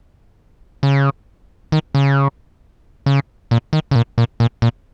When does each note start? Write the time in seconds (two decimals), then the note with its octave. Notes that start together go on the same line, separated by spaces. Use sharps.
0.83 C#3
1.72 D#3
1.95 C#3
3.06 C#3
3.51 A#2
3.73 D#3
3.91 C#3
3.95 A#2
4.18 A#2
4.40 A#2
4.62 A#2